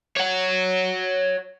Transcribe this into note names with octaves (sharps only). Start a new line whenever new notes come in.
C#5 F#5